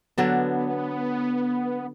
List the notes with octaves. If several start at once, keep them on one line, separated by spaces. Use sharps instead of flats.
D3 F#3 B3 D4